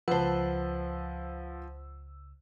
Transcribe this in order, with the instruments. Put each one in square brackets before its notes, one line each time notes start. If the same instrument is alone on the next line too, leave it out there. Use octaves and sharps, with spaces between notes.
[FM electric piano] C#2 E6 [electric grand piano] F3 [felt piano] B4 A5 [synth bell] C5 F#5